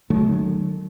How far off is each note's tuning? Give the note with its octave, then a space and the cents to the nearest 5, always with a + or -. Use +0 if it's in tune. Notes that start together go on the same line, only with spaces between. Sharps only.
D#3 -45 F#3 +0 A3 -30